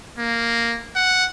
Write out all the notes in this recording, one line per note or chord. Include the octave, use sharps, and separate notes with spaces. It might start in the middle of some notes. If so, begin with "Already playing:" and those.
A#3
F#5